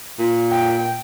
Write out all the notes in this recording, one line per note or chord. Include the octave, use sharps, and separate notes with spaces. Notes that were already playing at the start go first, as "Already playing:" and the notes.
A#2
G5